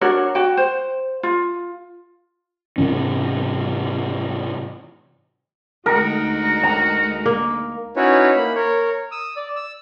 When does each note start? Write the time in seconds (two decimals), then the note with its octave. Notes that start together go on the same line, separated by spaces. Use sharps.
0.01 D4 F#4 A#4 C#5
0.35 F#4 G5
0.57 C5
1.23 F4
2.78 G#2 C3 E3 C#4
5.86 D2 G#3 D#4 F#4 A#4
6.63 A#5
7.26 A#3
7.96 C#4 D#4 E4 F#4 B4 C#5
8.36 A#3 B5
8.55 A#4 C#5
9.11 D#6 E6
9.36 D5
9.56 E6